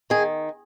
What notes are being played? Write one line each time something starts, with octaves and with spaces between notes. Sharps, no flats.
D#3 G#4